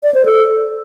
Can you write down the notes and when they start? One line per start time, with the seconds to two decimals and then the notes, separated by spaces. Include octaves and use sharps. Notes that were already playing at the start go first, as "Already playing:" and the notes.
0.03 D5
0.14 C5
0.25 A4